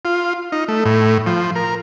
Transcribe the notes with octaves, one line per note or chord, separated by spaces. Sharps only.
F4
D#4
A3
A2
F3
A#4